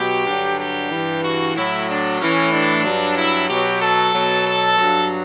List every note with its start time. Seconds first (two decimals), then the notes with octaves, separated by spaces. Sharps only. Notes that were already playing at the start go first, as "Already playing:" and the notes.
Already playing: B2 F#3 G4
0.26 G2 D3 F#3
0.59 G4
0.91 G2 E3
1.23 F#4
1.55 A2 F#3 E4
1.88 D4
2.20 A2 E3 C#4
2.52 D4
2.84 G2 F#3
3.17 E4
3.49 B2 F#3 G4
3.80 A4
4.13 B2 F#3
4.46 A4
4.78 G2 F#3